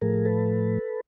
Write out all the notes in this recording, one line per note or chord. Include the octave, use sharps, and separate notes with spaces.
A2 F3 A3 G#4 A#4
A4 B4